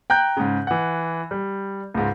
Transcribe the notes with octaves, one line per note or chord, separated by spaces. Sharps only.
G5 A#5 F#6 G6
G#2 C#3
E3 F#5
G3
C#2 G#2